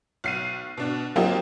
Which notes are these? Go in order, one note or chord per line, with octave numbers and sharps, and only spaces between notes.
B1 C7 D#7
B2 D4
F3 F#3 A#3 C4 D#4 G4